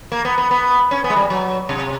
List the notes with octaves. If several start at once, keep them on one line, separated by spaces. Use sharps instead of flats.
A#3
B3
B3
B3
C#4
B3
G#3
G3
F#3
C3